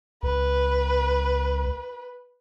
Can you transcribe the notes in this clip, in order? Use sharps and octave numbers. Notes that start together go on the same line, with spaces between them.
C#2 B4